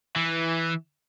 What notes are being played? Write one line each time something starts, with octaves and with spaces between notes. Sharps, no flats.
E3